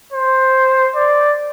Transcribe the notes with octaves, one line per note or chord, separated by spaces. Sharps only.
C5
D5